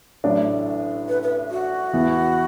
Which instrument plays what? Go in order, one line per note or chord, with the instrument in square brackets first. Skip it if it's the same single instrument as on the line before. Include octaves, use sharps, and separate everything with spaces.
[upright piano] A1 A2 F#3 D4
[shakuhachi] B4
B4
F#4
[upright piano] E2 E3 B3 E4